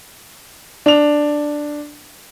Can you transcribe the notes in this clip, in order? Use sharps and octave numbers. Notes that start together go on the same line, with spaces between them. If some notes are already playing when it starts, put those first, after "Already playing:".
D4 F7